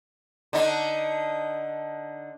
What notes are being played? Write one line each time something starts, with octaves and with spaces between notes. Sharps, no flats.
D3 D4 D#4